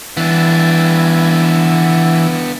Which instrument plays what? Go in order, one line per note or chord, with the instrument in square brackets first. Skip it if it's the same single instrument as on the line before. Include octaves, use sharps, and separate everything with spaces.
[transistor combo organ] E3 [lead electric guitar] B3 D4